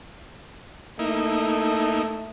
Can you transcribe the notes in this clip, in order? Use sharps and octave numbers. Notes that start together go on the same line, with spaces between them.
A3 A#3 D#4 E4